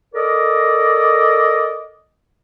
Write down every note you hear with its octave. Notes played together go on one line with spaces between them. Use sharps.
A4 A#4 D5 D#5